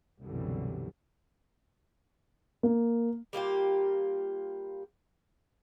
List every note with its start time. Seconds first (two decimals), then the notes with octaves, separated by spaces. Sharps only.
0.21 C2 F#2 B2 D3 E3 G3
2.63 A#3
3.33 G3 A#3 F4 G4